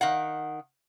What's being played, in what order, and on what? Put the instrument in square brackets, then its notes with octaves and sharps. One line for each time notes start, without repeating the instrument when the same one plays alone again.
[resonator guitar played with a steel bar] D#3 F5 F#5